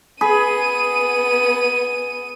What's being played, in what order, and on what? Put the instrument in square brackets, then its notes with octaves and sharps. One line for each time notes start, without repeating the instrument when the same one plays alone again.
[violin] B3 D#7 [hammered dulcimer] G#4 B5